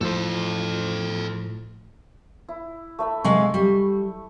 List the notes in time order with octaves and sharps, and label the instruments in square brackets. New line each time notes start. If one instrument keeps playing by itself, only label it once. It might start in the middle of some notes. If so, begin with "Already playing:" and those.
[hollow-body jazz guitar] A2 F3 [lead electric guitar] A4 C5
[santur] E4
A3 E5 B5
[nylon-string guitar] C3 G#3 F5 [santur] C#6
[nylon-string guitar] G3